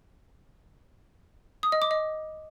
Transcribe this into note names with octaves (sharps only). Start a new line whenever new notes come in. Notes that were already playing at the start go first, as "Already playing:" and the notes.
D#6
D#5
D6
D#5